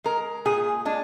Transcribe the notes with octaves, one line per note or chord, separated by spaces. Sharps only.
G#3 A#4
A#2 G#4
G#3 D4